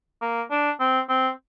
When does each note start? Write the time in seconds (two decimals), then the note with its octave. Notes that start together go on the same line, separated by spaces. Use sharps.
0.22 A#3
0.51 D4
0.80 C4
1.09 C4